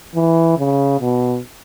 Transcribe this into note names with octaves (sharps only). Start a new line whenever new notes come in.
E3
C#3
B2